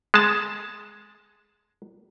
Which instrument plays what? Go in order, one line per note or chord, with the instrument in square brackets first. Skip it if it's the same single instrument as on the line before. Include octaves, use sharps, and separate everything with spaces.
[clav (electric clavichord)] G#3 A5